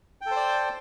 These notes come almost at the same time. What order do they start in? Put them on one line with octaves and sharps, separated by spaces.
G5 A4 C5 D5